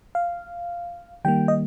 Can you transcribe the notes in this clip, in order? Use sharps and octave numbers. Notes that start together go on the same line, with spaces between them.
F5
D#3 G3 A#3 G5
D#5